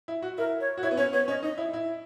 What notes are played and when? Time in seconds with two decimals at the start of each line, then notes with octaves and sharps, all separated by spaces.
0.08 E4
0.22 F#4
0.38 E4 A#4
0.60 C#5
0.77 F#4
0.83 E4 C#5
0.91 B3
0.97 C#4 C#5
1.13 B3 C#5
1.28 C#4 D#5
1.43 D#4 D#5
1.58 E4
1.73 E4